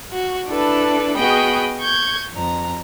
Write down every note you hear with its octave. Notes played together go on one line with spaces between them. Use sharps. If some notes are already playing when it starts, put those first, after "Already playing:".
F#4
D4 E4 A4 B4
B3 F#4 G#4 D#5 G5 B5
C#6 G6 G#6
F2 A#5